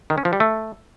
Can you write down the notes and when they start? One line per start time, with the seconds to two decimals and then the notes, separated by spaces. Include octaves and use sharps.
0.10 D#3
0.18 C#4
0.25 F3
0.33 G3
0.40 A3